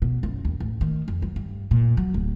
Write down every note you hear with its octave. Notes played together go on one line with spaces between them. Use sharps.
B2
F#2
D#2
A1
D#3
F2
F#3
G2
A#2
F#3
D1